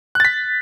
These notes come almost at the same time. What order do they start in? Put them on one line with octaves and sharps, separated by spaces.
F#6 A6 B6